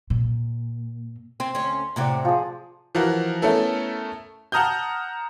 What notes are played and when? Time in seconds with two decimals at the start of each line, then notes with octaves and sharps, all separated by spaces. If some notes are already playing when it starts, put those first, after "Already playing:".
0.10 A#2
1.40 C4 C6
1.55 D2 C#4
1.96 A2 C3 C4 D5 F#5 A#5
2.25 F3 G#4
2.95 E3 F3 F#4 A#4
3.42 A3 B3 C#4 E4 A4 A#4
4.52 F#5 A5 A#5 D#6 F6 G6